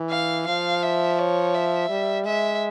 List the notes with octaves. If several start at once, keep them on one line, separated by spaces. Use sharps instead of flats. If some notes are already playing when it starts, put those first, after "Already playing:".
Already playing: E3
F5
F3 F5
E5
C#5
E5
G3
G#3 E5